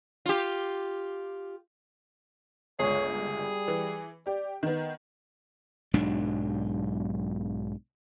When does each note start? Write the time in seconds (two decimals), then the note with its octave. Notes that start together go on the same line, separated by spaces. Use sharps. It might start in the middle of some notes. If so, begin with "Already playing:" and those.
0.26 F4 G4
2.79 G1 C#2 G#4 C#5
3.16 G3
3.68 E3
4.27 G4 D5
4.63 D#3 B3 D#4
5.93 B1 G#2 F#3 D4